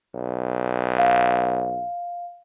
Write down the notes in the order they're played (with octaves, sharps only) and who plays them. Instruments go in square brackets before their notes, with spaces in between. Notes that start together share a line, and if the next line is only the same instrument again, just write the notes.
[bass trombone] B1
[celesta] F5